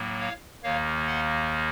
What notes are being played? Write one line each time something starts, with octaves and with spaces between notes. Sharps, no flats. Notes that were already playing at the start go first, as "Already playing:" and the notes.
Already playing: A2 F#3 A#3
C#5 F5
D#2 D#3 A#3 C#5 F5
D#5 F#5